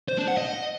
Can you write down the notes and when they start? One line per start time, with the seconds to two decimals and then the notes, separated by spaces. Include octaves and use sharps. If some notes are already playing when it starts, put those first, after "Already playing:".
0.09 C5
0.19 D4
0.28 F#5
0.38 D#5